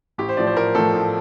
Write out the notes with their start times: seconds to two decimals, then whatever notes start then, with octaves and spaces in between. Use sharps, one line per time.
0.18 A1 G4
0.29 C5
0.37 A2 F3 D5
0.47 C5
0.56 A1 A#4
0.75 A2 F3 A4
0.94 A1